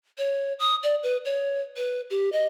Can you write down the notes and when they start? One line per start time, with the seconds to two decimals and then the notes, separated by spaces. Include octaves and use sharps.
0.18 C#5
0.59 D#6
0.83 D5
1.03 B4
1.25 C#5
1.77 B4
2.10 G4
2.32 D#5